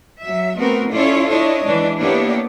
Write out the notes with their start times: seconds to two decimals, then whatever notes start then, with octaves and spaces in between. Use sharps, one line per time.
0.21 F#3 E5
0.56 A3 B3 C4 F#4 A#4
0.92 C#4 E4 F4 A4 C#5 D5
1.29 D4 E4 C#5 D#5
1.64 E3 G#3 D4
1.98 A#3 B3 D4 E4 G4 C#5